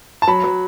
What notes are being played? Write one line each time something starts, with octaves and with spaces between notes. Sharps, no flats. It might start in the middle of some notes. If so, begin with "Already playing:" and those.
A5
F#3 B5
F#3